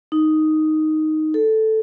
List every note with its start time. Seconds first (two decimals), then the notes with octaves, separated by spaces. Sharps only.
0.12 D#4
1.34 A4